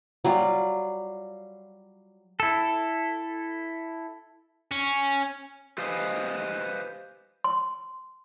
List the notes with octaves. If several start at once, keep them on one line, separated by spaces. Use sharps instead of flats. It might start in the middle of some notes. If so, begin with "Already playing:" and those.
F#3 G3 F4
E4 A4
C#4
G4 B4 C5 D#5 F5 G#5
C6